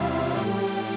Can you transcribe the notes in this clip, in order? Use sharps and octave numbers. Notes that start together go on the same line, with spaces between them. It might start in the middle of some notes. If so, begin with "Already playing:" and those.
Already playing: E2 C3 G3 E4 F4 E5 F5
A2 G3 G4 G5